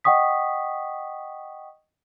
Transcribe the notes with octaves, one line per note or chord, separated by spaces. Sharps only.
D#5 F#5 G5 C#6 D#6 B6